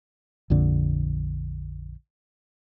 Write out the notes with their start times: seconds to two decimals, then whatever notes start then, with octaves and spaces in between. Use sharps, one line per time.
0.50 A#1 F2 D3